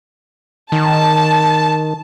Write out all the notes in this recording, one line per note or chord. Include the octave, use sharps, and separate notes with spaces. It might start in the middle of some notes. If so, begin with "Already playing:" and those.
D#3 A5